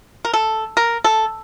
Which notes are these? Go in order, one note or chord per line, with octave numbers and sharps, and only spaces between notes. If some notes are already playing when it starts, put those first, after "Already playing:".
A#4
A4
A#4
A4